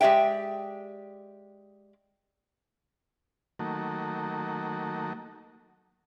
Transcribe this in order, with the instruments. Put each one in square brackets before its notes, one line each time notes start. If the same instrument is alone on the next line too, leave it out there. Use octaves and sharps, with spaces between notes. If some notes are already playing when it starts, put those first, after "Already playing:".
[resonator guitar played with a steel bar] G#3 G4 D5 E5 G5
[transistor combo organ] D#3 F#3 A3 A#3